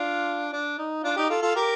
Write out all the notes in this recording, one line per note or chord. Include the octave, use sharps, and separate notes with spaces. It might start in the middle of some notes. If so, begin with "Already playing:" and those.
Already playing: D4 F4
D4
D#4
D4 F4
D#4 G4
F4 A4
F4 A4
G4 A#4